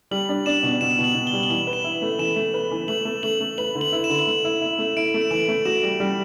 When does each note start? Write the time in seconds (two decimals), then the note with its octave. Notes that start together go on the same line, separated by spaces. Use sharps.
0.11 G3 F#7
0.29 D4
0.46 D4 E7
0.63 B2
0.81 B2 E7
0.99 B2
1.04 F#7
1.15 B2
1.27 G7
1.33 G3
1.43 G7
1.49 E3 F#7
1.67 B4
1.73 E7
1.84 E4
2.02 A3
2.19 E3 E7
2.36 A3
2.54 B4
2.71 E3
2.88 A3 F#7
3.05 A3
3.23 A3 F#7
3.41 A3
3.58 B4 F#7
3.75 D3
3.81 F#7
3.92 E4
4.04 E7
4.10 D3
4.27 A3
4.45 E4
4.61 E4
4.79 A3
4.97 E4 D7
5.14 A3
5.22 E7
5.31 E3 F#7
5.48 A3
5.65 F#4 E7
5.83 G3
6.00 G3